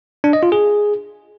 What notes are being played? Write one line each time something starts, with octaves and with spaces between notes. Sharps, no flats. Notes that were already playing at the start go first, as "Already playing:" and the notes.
D4
D#5
F4
G#4